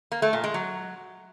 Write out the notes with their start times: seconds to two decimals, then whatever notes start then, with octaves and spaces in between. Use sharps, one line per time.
0.12 A#3
0.22 A3
0.33 A#2
0.44 G#3
0.54 F#3